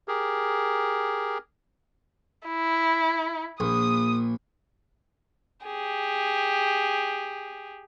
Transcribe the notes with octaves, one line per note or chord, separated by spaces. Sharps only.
G4 G#4 A#4
E4
A#1 D#6
G4 G#4